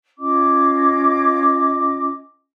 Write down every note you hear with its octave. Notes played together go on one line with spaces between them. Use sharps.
C#4 F4 D#5 D6